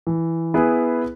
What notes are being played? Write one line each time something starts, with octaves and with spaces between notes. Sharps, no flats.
E3
B3 E4 G#4 B4